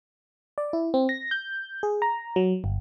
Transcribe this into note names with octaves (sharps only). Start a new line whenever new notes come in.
D5
E4
C4
A#6
G6
G#4
A#5
F#3
G1